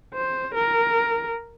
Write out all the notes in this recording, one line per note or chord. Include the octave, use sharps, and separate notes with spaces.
C5
A#4